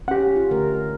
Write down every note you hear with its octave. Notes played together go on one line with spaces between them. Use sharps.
C#4 G4 F#5
F4
D3 A3 A#4